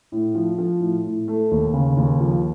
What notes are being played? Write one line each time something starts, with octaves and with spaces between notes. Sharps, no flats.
A2
F3
F3
A2
A2
A3
D#2
C#3
D#2
F3